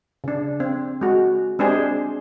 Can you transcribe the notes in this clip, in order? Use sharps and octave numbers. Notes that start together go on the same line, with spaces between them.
C#3 D4
C4
G#3 F#4
G#3 C4 D4 G4 G#4 C5